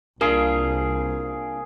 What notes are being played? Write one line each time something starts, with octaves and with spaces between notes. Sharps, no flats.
C2 A#3 D4 F4 G#4 A#4